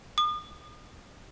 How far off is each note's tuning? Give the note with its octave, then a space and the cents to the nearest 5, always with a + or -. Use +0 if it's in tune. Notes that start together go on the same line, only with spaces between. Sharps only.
D#6 -40